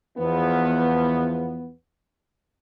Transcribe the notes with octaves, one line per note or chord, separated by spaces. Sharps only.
E2 F3 B3